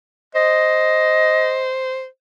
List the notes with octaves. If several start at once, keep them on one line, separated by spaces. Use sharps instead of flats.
C5 D#5